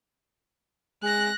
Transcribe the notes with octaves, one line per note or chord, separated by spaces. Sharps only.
G#3 F#6 A#6